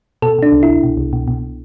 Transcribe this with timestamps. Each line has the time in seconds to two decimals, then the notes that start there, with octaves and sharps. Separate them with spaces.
0.22 B2 A4
0.39 B2 D4
0.52 C2
0.63 E4
0.68 C2
0.83 B2
0.97 C2
1.13 B2
1.28 B2